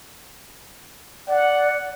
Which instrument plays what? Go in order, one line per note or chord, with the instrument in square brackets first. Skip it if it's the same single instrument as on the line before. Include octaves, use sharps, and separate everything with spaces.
[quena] D5 [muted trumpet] F#5